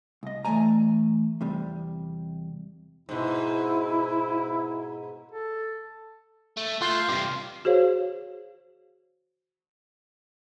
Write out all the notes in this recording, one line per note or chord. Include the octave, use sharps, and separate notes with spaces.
C2 D#5
E3 A3 E4 D5 G#5 A#5
E2 C3 G3
G#2 B2 E4
A4
A3
A3 F4 F5 C6 F#6 G6
G2 C3 F4 G4
F#4 G#4 C5 C#5 F5